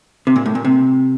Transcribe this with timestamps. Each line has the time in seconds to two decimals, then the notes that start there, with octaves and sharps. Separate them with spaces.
0.27 C3
0.36 A#2
0.46 A2
0.55 A#2
0.65 C3